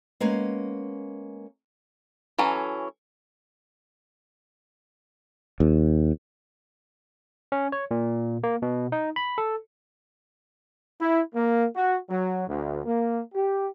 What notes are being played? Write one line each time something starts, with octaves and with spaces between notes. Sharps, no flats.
G#3 A#3 B3 C#4
E3 F#3 C#4 A4
D#2
C#4
C#5
A#2
A#3
B2
D#4
B5
A4
E4
A#3
F#4
F#3
D2
A#3
G4